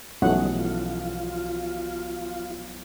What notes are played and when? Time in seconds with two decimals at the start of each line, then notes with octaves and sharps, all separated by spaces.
0.22 B1 E3 F3 G3 A3 C#4 D#4 F#5
0.58 F4